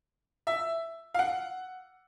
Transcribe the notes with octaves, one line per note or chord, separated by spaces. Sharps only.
E5
F5
F#5